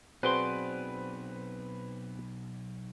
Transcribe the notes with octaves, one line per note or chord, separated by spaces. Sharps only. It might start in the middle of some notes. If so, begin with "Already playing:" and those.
B1 C4 F#4 G#4 B4 C5 D5 C6